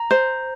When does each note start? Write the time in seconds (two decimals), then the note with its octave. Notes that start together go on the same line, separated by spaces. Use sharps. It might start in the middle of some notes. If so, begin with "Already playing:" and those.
Already playing: A#5
0.11 C5